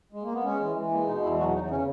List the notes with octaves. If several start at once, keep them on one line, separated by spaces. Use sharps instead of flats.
G#3
A#3
B3
G#3 C#4
E3
E3
G#3 A#3
B2 D#4
E2 E4
F#3 F#4
E2 D#4
C#3 C#4